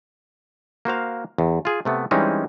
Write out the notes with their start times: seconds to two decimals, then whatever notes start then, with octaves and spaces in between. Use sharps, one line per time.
0.85 A#3 F#4 C5 F5
1.38 E2
1.65 F4 G#4
1.85 C3 A3 B3
2.11 E3 G3 G#3 C4 C#4 D#4